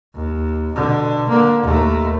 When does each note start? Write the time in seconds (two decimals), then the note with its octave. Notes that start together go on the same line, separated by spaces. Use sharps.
0.15 D#2
0.76 B2 D3
1.29 D3 A#3
1.63 D#2 A3